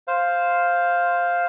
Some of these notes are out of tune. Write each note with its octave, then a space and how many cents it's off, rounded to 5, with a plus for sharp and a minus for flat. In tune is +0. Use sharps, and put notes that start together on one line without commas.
C5 +0 F5 +0